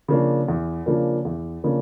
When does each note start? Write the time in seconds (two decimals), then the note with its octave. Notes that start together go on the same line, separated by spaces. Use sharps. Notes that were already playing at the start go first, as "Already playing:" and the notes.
0.08 C#3 F3 A#3 D4
0.48 E2
0.86 C#3 F3 A#3 D4
1.25 E2
1.64 C#3 F3 A#3 D4